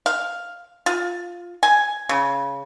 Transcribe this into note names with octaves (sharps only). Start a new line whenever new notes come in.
F5
F4
G#5
C#3